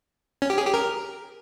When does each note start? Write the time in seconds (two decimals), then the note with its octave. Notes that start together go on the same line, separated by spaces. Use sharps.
0.42 C#4
0.50 G4
0.58 G#4
0.66 G4
0.74 A#4